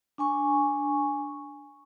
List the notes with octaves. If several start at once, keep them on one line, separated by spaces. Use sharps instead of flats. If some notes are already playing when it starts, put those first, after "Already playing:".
D4 G#5 C#6